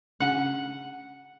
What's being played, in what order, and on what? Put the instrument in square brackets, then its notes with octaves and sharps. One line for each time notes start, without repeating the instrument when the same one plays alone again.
[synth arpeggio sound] C#3 C#4 D4 [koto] F#5